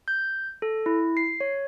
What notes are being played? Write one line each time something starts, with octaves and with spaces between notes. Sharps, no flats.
G6
A4
E4
C7
C#5